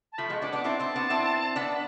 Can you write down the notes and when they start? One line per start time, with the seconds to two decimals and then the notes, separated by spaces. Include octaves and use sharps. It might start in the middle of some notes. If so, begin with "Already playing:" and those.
0.12 A5
0.18 F3 A3 B5
0.30 G#3 B3
0.42 B3 D4 D6
0.52 B3 D4 D6
0.64 C4 E4 A5
0.79 C4 E4
0.96 B3 D4
1.10 C4 E4
1.56 B3 D4 B5